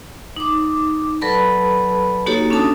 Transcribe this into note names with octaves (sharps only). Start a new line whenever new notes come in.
D#4 D6
F#3 A4 B4 D5 A5 B5
A#3 D#4 F#4 G4 A4 C#5
C#4 D4 A4 A5 D#6